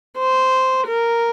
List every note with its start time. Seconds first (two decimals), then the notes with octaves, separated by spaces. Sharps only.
0.19 C5
0.87 A#4